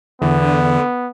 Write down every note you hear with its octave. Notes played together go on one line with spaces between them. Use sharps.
E2 D3 B3